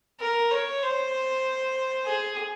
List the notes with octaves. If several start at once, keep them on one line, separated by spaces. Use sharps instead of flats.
A#4
C#5
C5
G#4